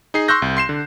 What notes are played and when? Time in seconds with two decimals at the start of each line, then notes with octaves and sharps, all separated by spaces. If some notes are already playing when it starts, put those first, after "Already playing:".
0.14 D#4 G#4 C7
0.28 C6 C#6 E6 F#6 G6 A#6
0.42 C2
0.57 C6 C7 E7
0.69 D3